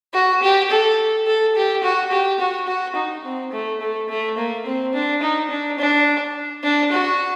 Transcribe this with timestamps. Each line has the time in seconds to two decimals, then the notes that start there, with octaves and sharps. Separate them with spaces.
0.14 F#4
0.42 G4
0.70 A4
1.27 A4
1.55 G4
1.83 F#4
2.12 G4
2.40 F#4
2.68 F#4
2.96 D#4
3.24 C4
3.52 A3
3.81 A3
4.09 A3
4.38 A#3
4.66 C4
4.94 D4
5.22 D#4
5.51 D4
5.79 D4
6.63 D4
6.92 F#4